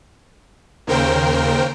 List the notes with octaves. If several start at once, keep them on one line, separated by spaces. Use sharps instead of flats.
D#2 C#3 A#4 C5 G5